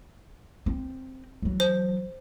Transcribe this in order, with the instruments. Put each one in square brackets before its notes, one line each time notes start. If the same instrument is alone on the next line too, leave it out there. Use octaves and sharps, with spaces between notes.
[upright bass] C4
E3 F#3
[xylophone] C5